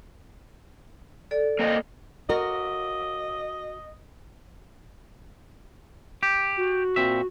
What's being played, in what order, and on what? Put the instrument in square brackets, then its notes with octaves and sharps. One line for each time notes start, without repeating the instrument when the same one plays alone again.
[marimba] A4 D5
[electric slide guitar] A#3 C4 D#5
[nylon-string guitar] F#4 A#4 [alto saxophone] D#5
[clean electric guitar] G4
[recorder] F#4
[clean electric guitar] A#2 C4 E5